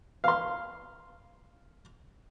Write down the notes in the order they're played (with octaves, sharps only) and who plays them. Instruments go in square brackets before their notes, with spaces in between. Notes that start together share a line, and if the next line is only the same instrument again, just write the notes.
[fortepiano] F5 C6